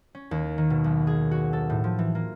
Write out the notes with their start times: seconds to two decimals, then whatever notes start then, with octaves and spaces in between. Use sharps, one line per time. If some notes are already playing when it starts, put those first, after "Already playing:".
0.15 C#4
0.31 D#2
0.58 D#3
0.70 B2
0.84 B1
1.07 G#4
1.31 F#4
1.53 A4
1.70 A2
1.84 F3
1.99 E3
2.15 A#3